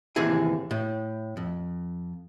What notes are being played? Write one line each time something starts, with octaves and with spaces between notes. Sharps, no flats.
D#2 A2 C3 E3 G#4 G#5
A2
F2